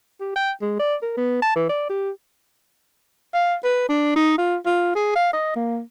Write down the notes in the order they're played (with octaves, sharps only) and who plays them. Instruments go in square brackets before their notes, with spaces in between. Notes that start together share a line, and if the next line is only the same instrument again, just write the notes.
[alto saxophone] G4
G5
G#3
D5
A#4
B3
A5
E3
D5
G4
F5
B4
D4
D#4
F4
F4
G#4
F5
D#5
A#3